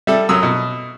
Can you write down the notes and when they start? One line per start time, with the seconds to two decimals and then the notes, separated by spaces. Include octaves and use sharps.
0.07 G3 A4 E5
0.29 F#2 F#3 D#6 E6
0.43 B2